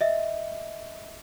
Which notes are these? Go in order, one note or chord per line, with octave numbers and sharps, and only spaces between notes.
D#5 E5